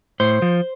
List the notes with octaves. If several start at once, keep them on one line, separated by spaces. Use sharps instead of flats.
A2 C5
F3